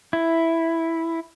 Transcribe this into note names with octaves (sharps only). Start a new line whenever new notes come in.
E4